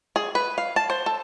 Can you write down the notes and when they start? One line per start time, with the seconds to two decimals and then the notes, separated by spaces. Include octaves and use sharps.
0.16 G#4
0.35 B4
0.58 F5
0.76 A5
0.90 C5
1.06 A4